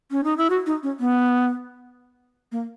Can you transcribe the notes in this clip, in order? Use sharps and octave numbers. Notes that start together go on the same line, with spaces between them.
C#4
D#4
E4
F#4
D#4
C#4
B3
A#3